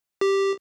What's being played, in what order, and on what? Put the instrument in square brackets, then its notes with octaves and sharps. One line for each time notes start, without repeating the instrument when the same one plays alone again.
[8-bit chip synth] G4